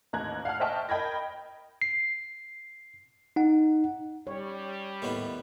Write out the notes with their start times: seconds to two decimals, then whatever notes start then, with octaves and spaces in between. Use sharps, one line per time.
0.13 A1 D#2 A#5 F#6 G#6
0.45 F5 F#5 A5 F6
0.60 C5 D#5 E5 G5 A5 C#6
0.89 A#4 D#5 G5 B5 G#6 A#6
1.82 C7
3.36 D#4 F#5
4.27 G3 C#5
5.02 D#2 A2 B3